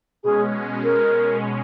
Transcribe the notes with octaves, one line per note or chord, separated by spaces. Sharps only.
B2 G#3 C#4 G#4
A#4